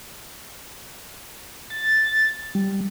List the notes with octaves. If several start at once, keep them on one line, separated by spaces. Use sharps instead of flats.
A6
G3